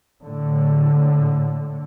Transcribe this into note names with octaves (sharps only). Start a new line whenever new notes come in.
A2 D3